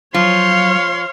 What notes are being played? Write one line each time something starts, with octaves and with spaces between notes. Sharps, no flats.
F3 F#3 C#5 F5 C6